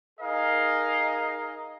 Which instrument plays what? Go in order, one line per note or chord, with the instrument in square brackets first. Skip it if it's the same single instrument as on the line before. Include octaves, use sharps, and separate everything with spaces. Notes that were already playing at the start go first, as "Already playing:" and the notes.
[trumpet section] D#4 G#4 A#4 D#5 F5